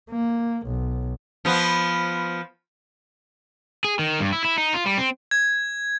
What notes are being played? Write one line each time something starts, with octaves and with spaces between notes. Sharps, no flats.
A#3
B1
F3 B3
G#4
D#3
G2
E4
E4
D#4
F4
G3
C4
G#6